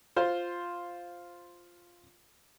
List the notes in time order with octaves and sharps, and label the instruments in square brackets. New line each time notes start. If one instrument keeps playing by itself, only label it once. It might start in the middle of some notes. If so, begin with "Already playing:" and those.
[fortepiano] F4 C5